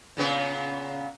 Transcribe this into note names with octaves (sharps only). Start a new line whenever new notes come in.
A#2 C#3 B3